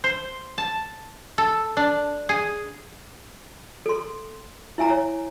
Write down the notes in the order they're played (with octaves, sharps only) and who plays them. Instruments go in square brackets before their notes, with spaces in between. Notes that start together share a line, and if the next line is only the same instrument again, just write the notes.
[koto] C5
A5
A4
D4
G#4
[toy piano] A4 C6
E4 E5 G#5 A#5
C#5